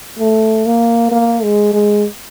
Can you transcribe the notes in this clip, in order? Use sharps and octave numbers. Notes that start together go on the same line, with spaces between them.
A3
A#3
A#3
G#3
G#3